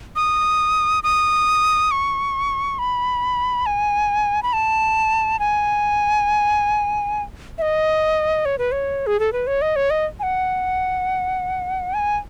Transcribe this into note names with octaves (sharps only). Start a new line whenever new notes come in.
D#6
D#6
C#6
B5
G#5
B5
A5
G#5
E5
D#5
C#5
B4
C#5
G#4
A4
B4
C#5
D#5
C#5
D#5
G#5
F#5
G#5